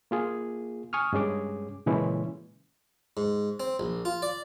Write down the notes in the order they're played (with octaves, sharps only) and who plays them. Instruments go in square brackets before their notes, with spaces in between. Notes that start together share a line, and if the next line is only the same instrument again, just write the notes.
[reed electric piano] A#3 F4 G#4
G#5 C#6 D#6 F6
G2 G#3 C#4 G#4 D6
A#2 C#3 E3 G#3 C#4 E4
[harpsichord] G#2
C4
A#1
F4
D5